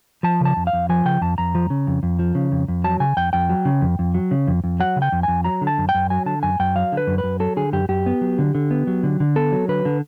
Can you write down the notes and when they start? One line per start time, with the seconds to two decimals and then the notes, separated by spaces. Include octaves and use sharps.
0.23 F3 A5
0.41 C#3 A5
0.57 F2
0.67 F5
0.73 F2
0.89 F3 G#5
1.05 C#3 G5
1.21 F2 A5
1.38 F2 A#5
1.55 F3
1.70 C#3
1.87 F2
2.03 F2
2.19 F3
2.35 C#3
2.52 F2
2.68 F2
2.84 F#3 A5
3.00 C#3 G#5
3.17 F2 G5
3.33 F2 G5
3.49 F#3
3.65 C#3
3.82 F2
3.99 F2
4.14 F#3
4.31 C#3
4.48 F2
4.64 F2
4.80 F#3 F#5
4.96 C#3
5.02 G5
5.12 F2
5.23 F2 G#5
5.44 F#3 A#5
5.61 D3
5.67 A5
5.78 F#2
5.89 G5
5.95 F#2
6.10 F#3 G#5
6.26 D3 A5
6.43 F#2 G#5
6.60 F#2 G5
6.76 F#3 F5
6.92 D3
6.97 B4
7.07 F#2
7.18 B4
7.24 F#2
7.40 F#3 A4
7.57 D3 G#4
7.73 F#2 G4
7.89 F#2 G4
8.06 B3
8.21 F#3
8.39 D3
8.55 D3
8.71 B3
8.87 F#3
9.03 D3
9.20 D3
9.36 B3 A4
9.52 F#3
9.68 D3 B4
9.85 D3